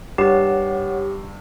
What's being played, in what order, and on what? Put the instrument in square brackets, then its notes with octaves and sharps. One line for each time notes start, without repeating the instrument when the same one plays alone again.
[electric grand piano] G2 C7 E7 [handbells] G4 [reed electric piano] C#5 F#5